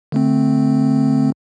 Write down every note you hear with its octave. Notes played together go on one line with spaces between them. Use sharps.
D3 A3 C4